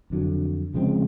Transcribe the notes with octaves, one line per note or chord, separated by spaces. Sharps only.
F2 D3 F#3
C#3 F3 G#3 C4